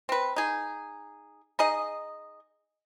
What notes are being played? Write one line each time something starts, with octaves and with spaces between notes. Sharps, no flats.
C4 B4
D#4 G#4
D#4 G#4 D#5